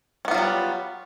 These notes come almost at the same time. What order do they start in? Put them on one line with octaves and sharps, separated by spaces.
C#4 B3 F4 F#3 G3